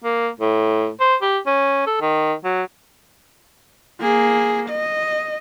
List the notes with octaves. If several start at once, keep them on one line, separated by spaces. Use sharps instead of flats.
A#3
A2
C5
G4
C#4
A4
D#3
F#3
A#3 G#4
D#5